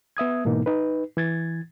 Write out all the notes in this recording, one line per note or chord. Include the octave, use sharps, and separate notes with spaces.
B3 E5 D#6 G#6
G#2 B2 E3 A#3 D#4
D#4 B4
E3 G#6 A6